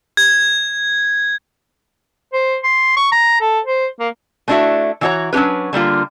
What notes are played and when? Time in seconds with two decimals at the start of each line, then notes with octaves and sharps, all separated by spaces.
0.17 G#6
2.34 C5
2.64 C6
2.97 C#6
3.12 A#5
3.41 A4
3.65 C5
4.00 A#3
4.48 A3 A#3 D4 E4 F#4 E5
5.01 E3 D4 E4 F#4 C#5 A#5
5.33 F#3 C#4 D4 G4 B4
5.73 D3 G3 A#3 F4